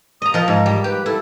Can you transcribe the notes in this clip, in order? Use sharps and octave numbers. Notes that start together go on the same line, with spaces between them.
D#5 A#5 D#6
F3 A#4 D#5
G#2 D#5
G3
G4 B4
E4 A4